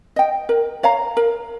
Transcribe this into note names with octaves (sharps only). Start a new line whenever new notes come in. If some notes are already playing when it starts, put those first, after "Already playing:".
D#5 G5
A#4
C#5 F5 A#5
A#4